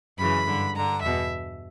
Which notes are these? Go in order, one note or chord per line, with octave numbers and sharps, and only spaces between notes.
F#2 C#3 E3 B5
G2 D3
G2 D3 A#5
E2 B2 E5